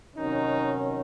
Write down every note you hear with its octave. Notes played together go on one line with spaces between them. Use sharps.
C3 D#3 F#3 C#4 D#4